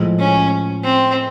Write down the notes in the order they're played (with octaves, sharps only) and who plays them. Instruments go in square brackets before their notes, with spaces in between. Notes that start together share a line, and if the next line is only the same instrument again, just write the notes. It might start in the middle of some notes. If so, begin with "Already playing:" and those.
Already playing: [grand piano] A2 F3 G#3
[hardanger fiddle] C#4
C4